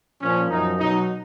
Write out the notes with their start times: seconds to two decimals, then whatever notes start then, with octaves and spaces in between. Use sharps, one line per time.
0.21 A#2 F3 C#4
0.49 F#2 F3 D#4
0.77 B2 F#3 D#4